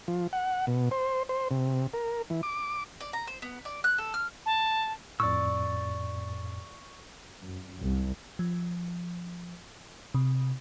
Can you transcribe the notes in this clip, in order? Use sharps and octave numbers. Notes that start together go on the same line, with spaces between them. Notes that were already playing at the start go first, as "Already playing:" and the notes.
F3
F#5
B2
C5
C5
C3
A#4
E3
D6
D5
A#5
C5
B3
D5
F#6
A4
F6
A5
F2 A2 D5 C#6 E6
F#2
C2
F3
C3